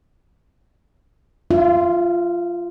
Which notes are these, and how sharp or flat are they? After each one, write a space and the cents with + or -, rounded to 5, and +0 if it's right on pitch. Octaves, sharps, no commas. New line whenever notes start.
F4 -10 E5 +30